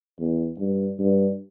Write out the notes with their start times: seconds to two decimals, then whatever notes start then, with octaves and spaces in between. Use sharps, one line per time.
0.20 E2
0.59 G2
0.99 G2